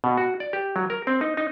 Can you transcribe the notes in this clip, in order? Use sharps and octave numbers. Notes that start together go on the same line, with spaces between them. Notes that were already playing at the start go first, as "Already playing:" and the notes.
B2
F#4
D5
G4
F#3
A#4
C4
D#4
D#4